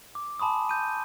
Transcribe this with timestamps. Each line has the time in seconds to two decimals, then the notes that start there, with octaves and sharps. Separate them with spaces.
0.15 D6
0.39 G#5 A5 B5 C6 D#6
0.69 B5 G6 D#7